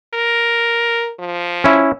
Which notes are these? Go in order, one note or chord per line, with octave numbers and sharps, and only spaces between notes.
A#4
F3
C#4 E4